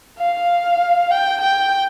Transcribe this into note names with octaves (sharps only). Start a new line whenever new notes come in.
F5
G5
G5